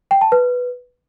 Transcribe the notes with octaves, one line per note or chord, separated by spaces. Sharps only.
G5
A5
B4